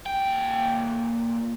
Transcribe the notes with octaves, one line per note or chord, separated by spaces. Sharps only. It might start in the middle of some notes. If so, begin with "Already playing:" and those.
A#2 G5